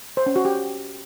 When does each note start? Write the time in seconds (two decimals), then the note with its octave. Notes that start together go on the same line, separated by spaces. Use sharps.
0.17 C5
0.26 C#4
0.36 F#4
0.45 G4